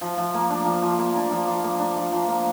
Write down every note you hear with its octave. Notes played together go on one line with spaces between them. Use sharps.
F3
F3
A#3
D4
F3
F3
A#3
D4
F3
F3
A#3
D4
F3
F3
A#3